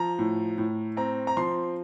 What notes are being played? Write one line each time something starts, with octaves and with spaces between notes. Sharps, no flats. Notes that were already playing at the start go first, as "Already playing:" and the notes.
Already playing: F3 A#5
A2
A2
C4 A#5
A#5
F3 C6